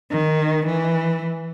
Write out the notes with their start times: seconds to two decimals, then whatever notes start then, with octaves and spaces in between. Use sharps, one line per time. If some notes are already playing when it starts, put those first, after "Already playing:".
0.11 D#3
0.66 E3